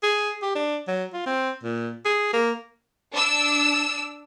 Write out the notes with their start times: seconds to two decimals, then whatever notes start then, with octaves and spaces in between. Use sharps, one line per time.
0.03 G#4
0.42 G4
0.55 D4
0.88 F#3
1.14 F4
1.26 C4
1.63 A#2
2.05 G#4
2.33 A#3
3.13 D4 E6